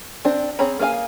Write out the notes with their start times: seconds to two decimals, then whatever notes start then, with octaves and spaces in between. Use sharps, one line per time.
0.25 C4 D4 C5
0.59 C4 G#4 C#5 A#5 B5
0.79 A#3 G#4 B4 F5 G#5